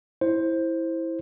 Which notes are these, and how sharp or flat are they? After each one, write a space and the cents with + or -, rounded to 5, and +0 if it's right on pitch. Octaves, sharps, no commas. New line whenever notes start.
E4 -5 C5 +10